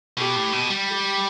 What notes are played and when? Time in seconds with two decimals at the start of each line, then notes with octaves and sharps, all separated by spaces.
0.17 B2 G4
0.36 A2
0.53 B2
0.70 G3
0.88 G4